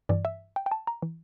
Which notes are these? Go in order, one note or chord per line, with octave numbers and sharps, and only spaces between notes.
G2 E3 D5
E5
G5
G5
A5
A#5
E3